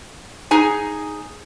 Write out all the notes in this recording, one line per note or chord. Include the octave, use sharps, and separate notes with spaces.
D#4 G#4 G#5